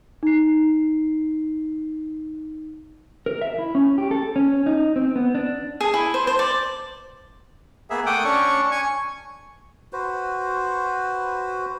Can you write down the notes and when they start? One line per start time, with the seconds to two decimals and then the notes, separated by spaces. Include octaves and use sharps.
0.23 D#4 C7
3.26 A#4
3.42 E5
3.58 E4
3.75 C#4
3.98 G4
4.11 A4
4.36 C#4
4.66 D#4
4.96 C4
5.16 B3
5.35 D4
5.81 G#4
5.94 E4
6.14 C5
6.27 C5
6.39 D5
7.90 A#3 B3 G#4 E5
8.06 A3 F#5 G5 D6 D#6
8.24 C#4 D4 C#6
8.71 G#5 C#6
9.93 F#4 B4 C5